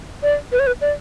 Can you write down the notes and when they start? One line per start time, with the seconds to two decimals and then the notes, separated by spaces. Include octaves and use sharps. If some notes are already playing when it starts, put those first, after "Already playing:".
0.23 D5
0.52 B4
0.59 C#5
0.67 B4
0.81 D5